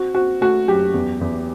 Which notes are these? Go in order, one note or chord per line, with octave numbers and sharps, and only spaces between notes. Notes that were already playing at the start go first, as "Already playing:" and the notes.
Already playing: C4 F#4
C4 F#4
A3 F#4
F#2 G4
E2
E2